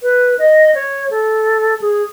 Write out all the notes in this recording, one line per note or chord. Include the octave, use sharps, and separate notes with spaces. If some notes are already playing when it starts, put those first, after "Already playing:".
B4
D#5
C#5
A4
G#4